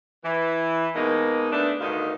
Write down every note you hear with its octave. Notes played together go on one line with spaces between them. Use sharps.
E3
B2 G#3 A#3 D#4
A3 B3 D4
D2 G2 B2 D#3 D#4 F5